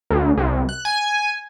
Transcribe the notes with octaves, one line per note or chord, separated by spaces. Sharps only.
D2
C2
F#6
G#5